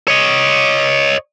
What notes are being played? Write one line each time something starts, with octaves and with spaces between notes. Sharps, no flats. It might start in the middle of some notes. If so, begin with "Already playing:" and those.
C#5 D#5